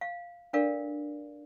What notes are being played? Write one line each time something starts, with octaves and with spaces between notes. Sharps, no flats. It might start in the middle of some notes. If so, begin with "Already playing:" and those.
F5
D4 A4 A#4 D5 F5